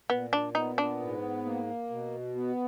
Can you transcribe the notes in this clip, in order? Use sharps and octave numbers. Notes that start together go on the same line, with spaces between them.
A#2 B3
D4
B3 D#4
D4
G#2
A#3
B2
B3